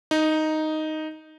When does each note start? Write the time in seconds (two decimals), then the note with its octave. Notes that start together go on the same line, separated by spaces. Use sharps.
0.11 D#4